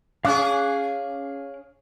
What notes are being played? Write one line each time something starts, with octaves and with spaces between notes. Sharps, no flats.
C#4 G#4 F5 D6 F#6